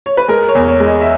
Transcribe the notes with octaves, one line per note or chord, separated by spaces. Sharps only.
C#5
B4
G#3 A#4
C#5
E2
C#5
G#3
D#5
E5